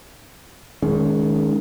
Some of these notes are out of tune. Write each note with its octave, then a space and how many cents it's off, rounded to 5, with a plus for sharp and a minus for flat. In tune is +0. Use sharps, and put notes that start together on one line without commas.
D#3 +0 G#3 +20 C#4 +25